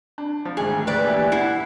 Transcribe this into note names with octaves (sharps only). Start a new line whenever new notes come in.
D4
F3
G#1 D2 G#4
B4 D5
A#2 E3 G4
E4 F#5 C7